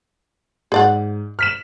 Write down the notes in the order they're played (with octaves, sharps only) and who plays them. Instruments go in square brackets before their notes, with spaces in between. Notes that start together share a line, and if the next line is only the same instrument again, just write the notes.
[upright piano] G#2 [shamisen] G#4 D5 F#5
[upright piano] F6 B6 E7